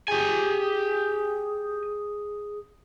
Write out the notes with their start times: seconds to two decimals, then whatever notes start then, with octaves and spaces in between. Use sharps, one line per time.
0.08 G4 G#4 G#5